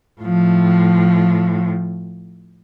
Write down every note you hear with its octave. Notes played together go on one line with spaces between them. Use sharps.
A2 F3